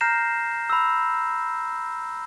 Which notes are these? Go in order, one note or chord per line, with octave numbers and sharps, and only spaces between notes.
A#5 F6 G6 A#6 C7 E7
B5 E6